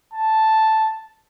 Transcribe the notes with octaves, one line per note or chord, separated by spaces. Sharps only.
A5